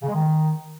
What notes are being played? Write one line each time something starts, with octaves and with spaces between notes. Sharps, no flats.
C#3
G#3
D#3